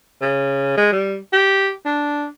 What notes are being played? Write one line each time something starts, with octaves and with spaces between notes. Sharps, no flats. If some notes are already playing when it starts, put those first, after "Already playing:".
C#3
G#3
G3
G4
D4